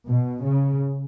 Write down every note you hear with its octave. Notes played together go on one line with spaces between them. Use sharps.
B2
C#3